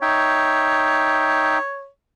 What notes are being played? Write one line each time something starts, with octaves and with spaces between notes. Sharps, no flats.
D#4 C#5 E5 G5